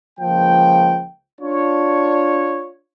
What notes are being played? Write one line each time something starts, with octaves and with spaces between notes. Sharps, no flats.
C#2 F3 A#3 G5
D4 F4 C#5